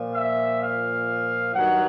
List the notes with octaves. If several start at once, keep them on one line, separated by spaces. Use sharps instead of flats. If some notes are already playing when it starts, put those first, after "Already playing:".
Already playing: A#2 F3
E5
F5
G2 D#3 F#3 F#5